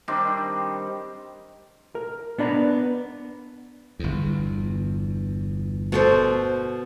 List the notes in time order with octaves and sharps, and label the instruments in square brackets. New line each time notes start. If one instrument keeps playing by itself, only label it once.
[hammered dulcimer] D#3 G3 C4 D4
[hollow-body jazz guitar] A#4
B3 D4 D5 A#5
[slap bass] G1 E2
[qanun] B2 A4 C5